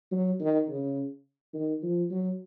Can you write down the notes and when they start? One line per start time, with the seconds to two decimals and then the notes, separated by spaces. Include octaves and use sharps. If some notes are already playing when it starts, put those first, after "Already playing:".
0.12 F#3
0.40 D#3
0.69 C#3
1.54 D#3
1.83 F3
2.11 F#3